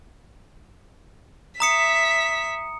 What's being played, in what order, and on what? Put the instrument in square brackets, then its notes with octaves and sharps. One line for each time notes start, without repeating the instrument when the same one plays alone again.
[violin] E5 B6 [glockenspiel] A#5 D#6 C#7